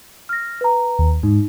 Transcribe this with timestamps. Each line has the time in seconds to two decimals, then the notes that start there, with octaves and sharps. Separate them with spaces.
0.29 F6 A#6
0.61 B4 A#5
0.99 D#2
1.23 G#2 D#4